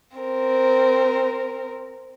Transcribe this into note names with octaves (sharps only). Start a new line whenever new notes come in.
C4 A#4